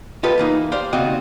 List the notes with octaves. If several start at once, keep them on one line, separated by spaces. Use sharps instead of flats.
F4 G4 A4 B4 D#5
E3 A#3 D#4
G4 C5 D5 F5
D#2 C#3 C4 F#4 D#5 G5